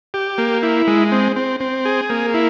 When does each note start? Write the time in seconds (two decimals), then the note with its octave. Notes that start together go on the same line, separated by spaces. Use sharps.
0.14 G4
0.38 A#3
0.63 E4
0.87 G#3
1.12 C4
1.36 C4
1.60 C4
1.85 G#4
2.10 A#3
2.34 E4